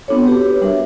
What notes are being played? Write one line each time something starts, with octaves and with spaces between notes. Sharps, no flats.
B3 C4 D4 F4 A4 C#5
F#4 G4 B4 C#5
G3 D4 A#4 E5